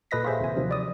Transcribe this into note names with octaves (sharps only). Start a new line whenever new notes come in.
A#2 A4 B4 D#5 A#6 B6
F4 G4 G#4 C5 E5
D#2 C3 G#5
C3 D#3 F3 F#3
D5 D#6